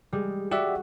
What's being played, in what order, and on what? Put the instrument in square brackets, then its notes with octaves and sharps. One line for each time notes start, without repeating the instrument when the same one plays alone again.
[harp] G3 G#3
[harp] F#4 [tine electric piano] G4 D5 E5